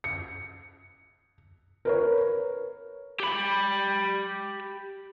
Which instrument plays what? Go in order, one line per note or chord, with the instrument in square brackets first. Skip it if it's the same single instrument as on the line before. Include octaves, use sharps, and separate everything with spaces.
[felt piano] C#7
A#4 B4 C#5
[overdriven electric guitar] G4 B5